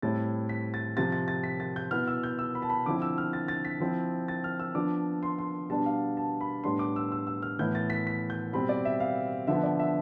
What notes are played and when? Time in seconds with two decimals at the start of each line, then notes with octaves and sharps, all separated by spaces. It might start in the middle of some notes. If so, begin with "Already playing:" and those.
0.02 A2 G3 C4 E4 A6
0.49 B6
0.74 A6
0.96 C3 F3 C4 A6
1.12 A6
1.28 A6
1.43 B6
1.60 A6
1.76 G6
1.91 B2 B3 E4 F6
2.07 E6
2.23 G6
2.39 E6
2.55 B5
2.62 A5
2.70 B5
2.86 D3 F3 C4 E4 D6
3.02 E6
3.18 F6
3.33 A6
3.48 A6
3.65 B6
3.80 F3 C4 E4
4.28 A6
4.44 F6
4.60 E6
4.74 F3 B3 D4 D6
5.23 C6
5.39 C6
5.69 B2 G3 B3 D4 A5
5.86 F5
6.17 A5
6.41 B5
6.64 A2 G3 B3 D4 C6
6.79 D6
6.96 E6
7.12 E6
7.27 E6
7.42 F6
7.59 A2 E3 B3 E4 G6
7.75 A6
7.90 B6
8.07 B6
8.30 G6
8.53 B2 G3 C4 B5
8.69 D5
8.85 E5
9.00 F5
9.47 D3 F3 B3 E5
9.63 D5
9.79 E5